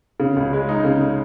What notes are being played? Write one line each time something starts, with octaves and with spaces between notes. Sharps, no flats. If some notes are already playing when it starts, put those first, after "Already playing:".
C#3
C#2
G#3
D#4
C#3